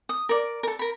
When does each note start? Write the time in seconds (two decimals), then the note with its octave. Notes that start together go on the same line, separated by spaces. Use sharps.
0.09 D#6
0.29 A#4 D5
0.63 A4 A#4
0.79 A#4 B5